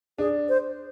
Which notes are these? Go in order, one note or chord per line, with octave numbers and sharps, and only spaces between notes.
D4 G#4
C5